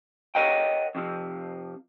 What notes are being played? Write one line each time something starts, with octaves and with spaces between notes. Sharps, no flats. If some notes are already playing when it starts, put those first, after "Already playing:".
A#4 C#5 D#5 F#5 G5
F2 C3 F3